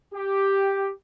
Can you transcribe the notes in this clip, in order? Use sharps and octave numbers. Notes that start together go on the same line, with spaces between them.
G4